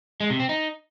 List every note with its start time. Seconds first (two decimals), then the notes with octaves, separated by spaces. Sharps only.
0.20 G#3
0.30 C3
0.40 C4
0.49 D#4